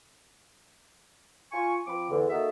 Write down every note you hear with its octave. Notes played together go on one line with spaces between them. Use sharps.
F4 G#5 C#6
F3 C4 B5 D6
E2 D3
A#3 D#4 F#4 G#4 A4 E5